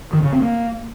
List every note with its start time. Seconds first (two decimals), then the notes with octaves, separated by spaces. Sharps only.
0.13 D#3
0.23 C#3
0.33 C4
0.42 A#3